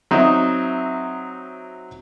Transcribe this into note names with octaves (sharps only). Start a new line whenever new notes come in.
F#3 C4 D#4 E5